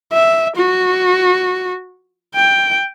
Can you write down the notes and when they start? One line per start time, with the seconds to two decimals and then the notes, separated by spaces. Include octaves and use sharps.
0.13 E5
0.56 F#4
2.35 G5